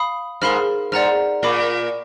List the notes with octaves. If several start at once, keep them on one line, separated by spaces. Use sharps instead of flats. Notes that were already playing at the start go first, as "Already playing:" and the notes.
Already playing: F5 B5 D#6
G#2 A#4 F5 B5 F6
G#2 D5 F#5 A#5 F6
A#2 A#4 D5 F5 B5 D6